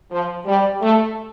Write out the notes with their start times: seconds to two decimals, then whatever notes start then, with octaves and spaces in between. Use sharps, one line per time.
0.11 F3
0.46 G3
0.81 A3